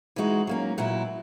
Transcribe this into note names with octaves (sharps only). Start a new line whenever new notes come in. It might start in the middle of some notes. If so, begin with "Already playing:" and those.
E3 G#3 D#4 F#4
F#3 A#3 C#4
A#2 F#3 B3 E4